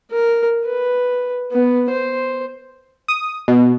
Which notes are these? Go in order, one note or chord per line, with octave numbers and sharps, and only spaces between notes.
A#4
B4
B3
C5
D#6
B2